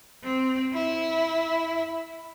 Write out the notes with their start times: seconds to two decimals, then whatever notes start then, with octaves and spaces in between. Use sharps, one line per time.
0.23 C4
0.74 E4